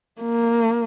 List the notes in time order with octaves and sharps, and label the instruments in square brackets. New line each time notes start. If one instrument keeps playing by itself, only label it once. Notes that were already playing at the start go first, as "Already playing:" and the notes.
[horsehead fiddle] A#3